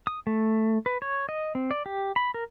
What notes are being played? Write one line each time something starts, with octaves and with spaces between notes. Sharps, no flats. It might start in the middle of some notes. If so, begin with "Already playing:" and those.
D#6
A3
B4
C#5
D#5
C4
D5
G4
B5
A#4